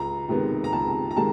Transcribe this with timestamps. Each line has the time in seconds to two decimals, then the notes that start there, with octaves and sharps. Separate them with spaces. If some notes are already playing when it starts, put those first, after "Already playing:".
Already playing: C#2 A#5
0.28 C3 D#3 G#3 B3
0.64 A#5
0.73 C#2 A5
1.11 A#5
1.16 C3 D#3 G#3 A5